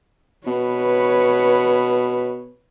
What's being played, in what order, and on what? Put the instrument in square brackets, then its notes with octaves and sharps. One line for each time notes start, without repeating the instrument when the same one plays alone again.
[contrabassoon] B2 [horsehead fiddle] B4 C#5